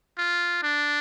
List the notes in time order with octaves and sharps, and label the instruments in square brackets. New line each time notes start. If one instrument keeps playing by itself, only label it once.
[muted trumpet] F4
D4